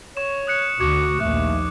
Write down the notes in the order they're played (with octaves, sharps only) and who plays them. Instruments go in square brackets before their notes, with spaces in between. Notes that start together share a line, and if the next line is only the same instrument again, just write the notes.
[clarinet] C#5 [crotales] C#6 E7
[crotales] D#6 F#6 C#7
[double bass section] D2 [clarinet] F#4 [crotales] D6 G#6 C#7
[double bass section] A#1 D#2 [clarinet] A3 [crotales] F#6